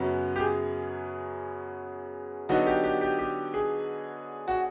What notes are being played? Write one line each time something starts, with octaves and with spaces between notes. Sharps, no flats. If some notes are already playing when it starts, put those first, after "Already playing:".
Already playing: F#2 C#3 F#3 B3
G4
G#4
D3 F#3 B3 D#4 F#4
G4
G4
G4
G4
G#4
F#4